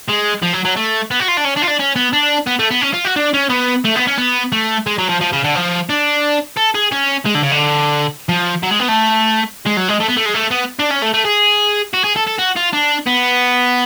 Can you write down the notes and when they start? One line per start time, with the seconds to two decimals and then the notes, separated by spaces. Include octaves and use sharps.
0.08 G#3
0.43 F3
0.53 F#3
0.65 F#3
0.77 A3
1.11 B3
1.20 F#4
1.28 F4
1.37 D4
1.45 C#4
1.56 D4
1.62 F4
1.67 D4
1.79 C#4
1.96 B3
2.13 D4
2.47 B3
2.59 A3
2.71 B3
2.81 C#4
2.93 F4
3.05 F#4
3.16 D4
3.34 C#4
3.49 B3
3.84 A3
3.95 B3
4.07 C#4
4.18 B3
4.52 A3
4.87 G#3
4.98 F#3
5.09 F3
5.21 F3
5.33 C#3
5.44 D3
5.55 F3
5.89 D4
6.57 A4
6.75 G#4
6.92 C#4
7.26 G#3
7.35 D3
7.43 C#3
7.52 D3
8.29 F3
8.63 F#3
8.71 G#3
8.80 B3
8.89 A3
9.66 G#3
9.77 F#3
9.88 G#3
10.00 A3
10.08 B3
10.17 A3
10.26 G#3
10.34 A3
10.51 B3
10.80 D4
10.91 C#4
11.02 A3
11.14 A3
11.25 G#4
11.94 F#4
12.04 G#4
12.16 A4
12.27 A4
12.39 F#4
12.57 F4
12.73 D4
13.07 B3